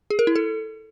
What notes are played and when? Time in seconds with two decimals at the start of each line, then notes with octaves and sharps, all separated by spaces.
0.10 G#4
0.19 A#4
0.27 E4
0.36 A4